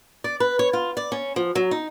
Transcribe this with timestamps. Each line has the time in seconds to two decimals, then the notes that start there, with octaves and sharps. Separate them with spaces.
0.24 D5
0.40 B4
0.59 C#5
0.73 F4
0.97 D5
1.12 C#4
1.36 F3
1.55 F#3
1.71 D#4